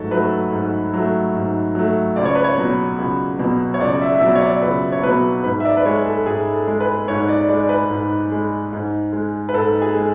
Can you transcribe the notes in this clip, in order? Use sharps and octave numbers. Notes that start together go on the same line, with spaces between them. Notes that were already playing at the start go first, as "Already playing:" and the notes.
Already playing: G#2 F#3 A3 A4 C#5
F#3 A3 B4
G#2
F#3 A3
G#2
F#3 A3
C#2 D5
C#5
B4
C#5
B2 F#3
C#2
B2 F#3
C#5
C#2 D5
D5
E5
E5
B2 F#3 D5
C#5
D5
C#2 B4
C#5
B2 F#3 B4
G#2 B4
E5
D5
B4
G#3 C#5
A4
G#2 G#4
A4
G#3
B4
G#2 C#5
D5
G#3 D5
B4
G#2
G#3
G#2
G#3
B4
G#2 A4
G#4
G#3